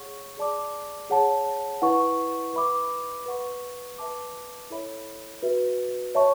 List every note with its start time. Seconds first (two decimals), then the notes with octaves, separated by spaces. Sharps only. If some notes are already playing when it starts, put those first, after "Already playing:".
Already playing: G#4 C#5 F#5 C#6
0.37 G#4 D5 A5 D6
1.10 G#4 C#5 F#5 A5
1.82 E4 B4 F#5 C#6
2.54 B4 E5 B5 D6
3.26 B4 F#5 C#6
3.98 B4 E5 A5 D6
4.70 E4 A4 C#5 E5 B5
5.43 F#4 B4 E5
6.15 C#5 E5 A5 C#6